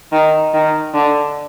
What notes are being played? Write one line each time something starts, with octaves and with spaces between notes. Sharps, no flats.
D#3
D#3
D3